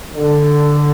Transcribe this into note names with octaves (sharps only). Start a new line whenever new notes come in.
D3